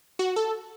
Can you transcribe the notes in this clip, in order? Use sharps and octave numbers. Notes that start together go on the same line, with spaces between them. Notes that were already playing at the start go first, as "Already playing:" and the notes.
F#4
A4